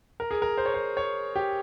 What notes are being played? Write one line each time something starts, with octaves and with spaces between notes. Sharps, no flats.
A#4
G#4
A#4
C5
C#5
C5
C#5
G4